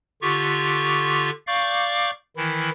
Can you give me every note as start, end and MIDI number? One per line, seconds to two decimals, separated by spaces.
0.22 1.30 50
0.22 1.30 65
0.22 1.30 67
0.22 1.30 85
1.47 2.11 74
1.47 2.11 77
1.47 2.11 85
1.47 2.11 86
1.47 2.11 91
2.37 2.70 51
2.37 2.70 52
2.37 2.70 64